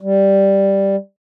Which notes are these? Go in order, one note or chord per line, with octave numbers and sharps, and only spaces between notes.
G3